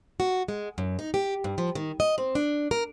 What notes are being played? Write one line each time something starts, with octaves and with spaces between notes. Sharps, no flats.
F#4
G#3
F#2
D#4
G4
G2
F3
D#3
D#5
C4
D4
A#4